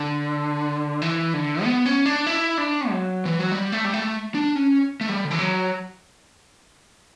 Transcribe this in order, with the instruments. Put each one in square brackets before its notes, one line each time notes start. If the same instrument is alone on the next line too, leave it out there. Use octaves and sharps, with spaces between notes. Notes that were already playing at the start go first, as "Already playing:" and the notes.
Already playing: [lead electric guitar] D3
E3
D3
B3
C#4
D4
E4
D4
F#3
E3
F#3
G3
A3
G3
A3
D4
C#4
A3
G3
D3
E3
F#3